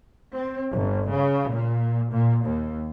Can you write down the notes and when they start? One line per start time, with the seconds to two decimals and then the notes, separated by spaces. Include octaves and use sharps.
0.32 C4
0.71 G1
1.11 C#3
1.51 A#2
2.11 A#2
2.45 D#2